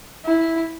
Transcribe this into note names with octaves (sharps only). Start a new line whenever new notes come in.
E4